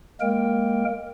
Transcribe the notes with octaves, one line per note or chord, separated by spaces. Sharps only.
G#3 A#3 A#4 G5